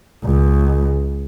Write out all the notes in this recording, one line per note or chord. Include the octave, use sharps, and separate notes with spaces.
C#2